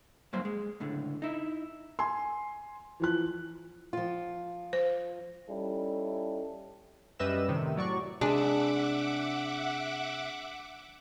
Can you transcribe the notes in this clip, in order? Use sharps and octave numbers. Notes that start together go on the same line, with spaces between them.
G2 F#3 A#3 C5
G#3
C#2 A2 D3
D#4 E4
G#5 C6
E3 F3 F#6
F3 F4
C5
G3 C#4 D#4 E4 A4
F#2 G3 B4 D#5 E5 E7
A2 C3 D#3
A2 F#3 D5 C#6
C3 G#3 D4 B4 D5 E5 F#5 D6